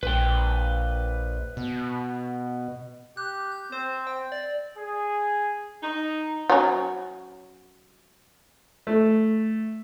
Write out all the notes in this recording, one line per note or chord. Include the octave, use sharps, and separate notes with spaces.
A#1 B4 G5
B2
G4 F#6
G6
C4 C5
G5
D5
G#4
D#4
F#3 C#4
A3